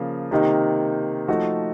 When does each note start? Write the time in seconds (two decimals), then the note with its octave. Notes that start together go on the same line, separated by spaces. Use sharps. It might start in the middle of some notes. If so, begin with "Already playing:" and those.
Already playing: C#3 F3 A#3 F4
0.31 C3 D#3 A#3 D#4
1.28 F3 A3 D#4 F#4